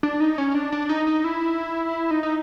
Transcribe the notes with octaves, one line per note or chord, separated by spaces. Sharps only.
D4
D#4
C#4
D4
D4
D#4
D#4
E4
D#4
D#4